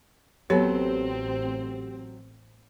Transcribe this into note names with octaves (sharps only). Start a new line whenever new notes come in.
A1 F#3 B3 C4 G4 A4 B4 C#5